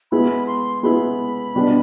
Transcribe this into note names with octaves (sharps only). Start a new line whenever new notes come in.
G#3 B3 E4 B5
C6
G#3 B3 E4 B5
B2 G3 B3 D4